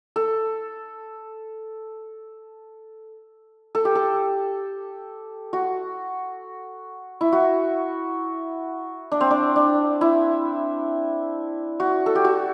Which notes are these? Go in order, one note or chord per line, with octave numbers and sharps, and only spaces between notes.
A4
A4
G4
A4
F#4
E4
F#4
D4
C4
D4
D4
E4
F#4
A4
G4
F#4